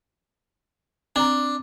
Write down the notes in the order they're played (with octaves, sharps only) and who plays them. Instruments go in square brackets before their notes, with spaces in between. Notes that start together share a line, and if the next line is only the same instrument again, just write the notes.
[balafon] C4 A#5 [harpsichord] D4